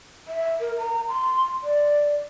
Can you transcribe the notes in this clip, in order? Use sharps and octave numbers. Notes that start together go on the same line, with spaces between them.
E5
A#4
A#5
C6
D5